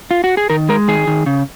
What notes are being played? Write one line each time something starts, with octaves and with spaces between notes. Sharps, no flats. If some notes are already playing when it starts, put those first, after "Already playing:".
F4
F#4
G#4
D#3 A#4
G#3 A#4
D#3 G#4
D#3
C#3